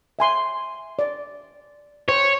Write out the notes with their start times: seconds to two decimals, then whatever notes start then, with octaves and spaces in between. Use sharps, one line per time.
0.19 E5 G#5 C6
0.99 D5
2.08 C5 C#5